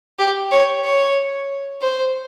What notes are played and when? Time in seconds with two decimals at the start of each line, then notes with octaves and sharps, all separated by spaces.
0.19 G4
0.52 C#5
0.84 C#5
1.81 C5